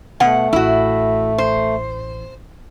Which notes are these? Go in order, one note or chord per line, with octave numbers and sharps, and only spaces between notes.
B2 A3 F#5
A1 E4 F#4
C5